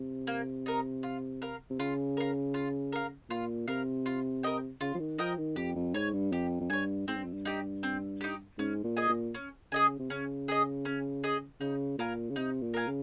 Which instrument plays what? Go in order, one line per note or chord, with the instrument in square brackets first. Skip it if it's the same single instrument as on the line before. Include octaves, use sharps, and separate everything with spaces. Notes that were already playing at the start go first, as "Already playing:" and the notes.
Already playing: [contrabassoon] C3
[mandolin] A#3
D#4 A#4
F4
A#4 F5
[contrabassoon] C3
[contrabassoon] C#3 [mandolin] F4
[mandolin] A#4 F5
F4
A#4 F5
[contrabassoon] A#2 [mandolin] F4
[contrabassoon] C3 [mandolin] A#4 F5
[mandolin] F4
A#4 D#5 G5
[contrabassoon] C#3 [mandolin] F4
[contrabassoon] F3
D#3
[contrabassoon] F3 [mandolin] A#4 D#5 G5
[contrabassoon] D#3
[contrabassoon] F2 [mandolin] G4
[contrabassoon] F2
[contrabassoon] G#2 [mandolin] C#5 G#5
[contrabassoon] G2
[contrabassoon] F2 [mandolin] G4
[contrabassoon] F2
[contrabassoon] G2 [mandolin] C#5 G#5
[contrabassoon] G#2 [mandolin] C4
[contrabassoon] G2
F2
G2
[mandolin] D#4 G4
C4
D#4 G4
[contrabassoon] G#2 [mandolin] C#4
[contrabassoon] A#2
[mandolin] G#4 D#5 G#5
[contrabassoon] A#2
[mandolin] C#4
[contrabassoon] C#3 [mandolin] G#4 D#5 G#5
[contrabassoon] C3
[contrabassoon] C#3 [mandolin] C#4
[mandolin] G#4 D#5
C#4
G#4 D#5
[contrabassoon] C#3 [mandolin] D#4
[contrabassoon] A#2 [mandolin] A#4 F5 G#5
[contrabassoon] C#3
[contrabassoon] C3 [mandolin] D#4
[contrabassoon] A#2
[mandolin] A#4 F5 G#5
[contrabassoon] C#3